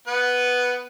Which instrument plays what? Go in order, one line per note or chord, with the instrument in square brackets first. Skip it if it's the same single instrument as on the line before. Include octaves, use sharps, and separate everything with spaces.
[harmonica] B3 B4